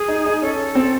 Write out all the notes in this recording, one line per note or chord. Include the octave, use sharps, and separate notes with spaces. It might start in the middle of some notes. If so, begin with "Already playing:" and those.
Already playing: G#4
D#4
D#4
C#4 A4
C4